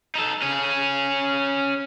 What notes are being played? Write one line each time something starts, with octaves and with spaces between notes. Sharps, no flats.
D#4 A4
C#4 G#4